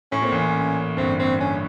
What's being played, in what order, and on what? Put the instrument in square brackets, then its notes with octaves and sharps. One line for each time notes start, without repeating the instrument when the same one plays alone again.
[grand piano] A2 [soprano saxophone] C#4
[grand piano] A#2 [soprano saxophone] C4
[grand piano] A1 A2 [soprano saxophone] C#4
[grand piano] G1 G2 [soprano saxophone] C4
[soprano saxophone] C4
C#4